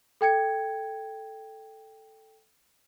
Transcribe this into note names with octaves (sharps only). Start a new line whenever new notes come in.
A4 G5 G#6 C#7